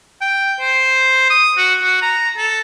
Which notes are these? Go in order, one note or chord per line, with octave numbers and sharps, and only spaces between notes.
G5
C5
D#6
F#4
F#4
A#5
A4